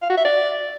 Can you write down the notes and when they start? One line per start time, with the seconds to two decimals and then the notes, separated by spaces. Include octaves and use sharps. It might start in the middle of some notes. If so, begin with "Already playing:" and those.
0.02 F5
0.10 F#4
0.17 E5
0.24 D5